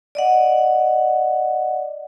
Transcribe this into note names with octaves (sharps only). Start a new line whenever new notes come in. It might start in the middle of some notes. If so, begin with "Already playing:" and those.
D5 D#5 F#5